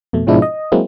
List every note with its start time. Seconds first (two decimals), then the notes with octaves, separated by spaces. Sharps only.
0.13 F2 B2 A3
0.27 G#2 B2 F3 G#3 D4 E4
0.42 D#5
0.72 F#3 G#3 A#3 C4 E4